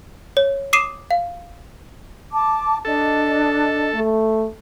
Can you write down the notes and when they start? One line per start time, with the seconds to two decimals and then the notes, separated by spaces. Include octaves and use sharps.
0.37 C#5
0.73 D6 D#6 C7 D#7 E7
1.11 F5
2.32 A5 D6
2.85 D4 A4 D#5
3.94 A3